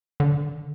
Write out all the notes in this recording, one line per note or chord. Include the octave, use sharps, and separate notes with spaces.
D3